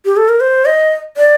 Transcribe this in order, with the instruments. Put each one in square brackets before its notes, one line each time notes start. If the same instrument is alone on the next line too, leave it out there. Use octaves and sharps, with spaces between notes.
[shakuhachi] G4
A4
A#4
C5
D#5
D5